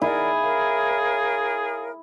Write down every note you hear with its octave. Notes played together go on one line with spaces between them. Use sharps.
E4 G#4 A#4 D5 F#5
A#4 C#5 F5